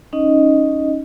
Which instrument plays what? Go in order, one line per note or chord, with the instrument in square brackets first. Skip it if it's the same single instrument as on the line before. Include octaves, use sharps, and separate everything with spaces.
[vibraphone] C#4 D#4 D#5